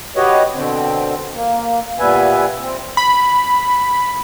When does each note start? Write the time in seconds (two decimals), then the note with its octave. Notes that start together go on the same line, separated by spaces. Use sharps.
0.16 F#4 G4 B4 C#5 D#5
0.54 B2 D3 C4
1.33 A#3
1.99 A#2 G3 B3 B4 E5 G#5
2.60 C4
2.97 B5